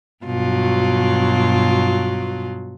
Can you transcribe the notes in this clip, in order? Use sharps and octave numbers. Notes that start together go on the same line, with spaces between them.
G2 B2 F#3 F4